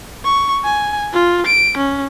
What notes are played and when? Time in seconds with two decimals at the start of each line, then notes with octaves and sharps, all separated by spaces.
0.24 C#6
0.64 G#5
1.13 F4
1.46 D7
1.77 C#4